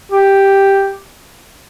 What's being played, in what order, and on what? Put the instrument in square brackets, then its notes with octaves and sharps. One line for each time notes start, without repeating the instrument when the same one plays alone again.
[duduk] G4